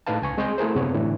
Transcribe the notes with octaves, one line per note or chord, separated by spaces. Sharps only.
A2 D#4 B4 F5 A5
C#2 G#5 C#6
G#3 C4 D#5 G#5 C6 G6
A3 E4 G#4 A#4 C5
F#2 C3 B3 C#5
A2 D3 E3